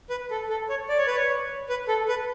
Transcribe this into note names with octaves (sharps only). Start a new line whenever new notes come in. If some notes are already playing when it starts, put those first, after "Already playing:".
B4
A4
A4
C#5
D5
C#5
B4
C#5
B4
A4
B4